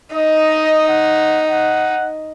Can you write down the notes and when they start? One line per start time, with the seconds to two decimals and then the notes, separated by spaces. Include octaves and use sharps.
0.15 D#4 D#5
0.89 F#5
1.50 F#5